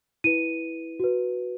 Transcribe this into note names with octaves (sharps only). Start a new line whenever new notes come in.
E4 B4 D#7
F#4 B4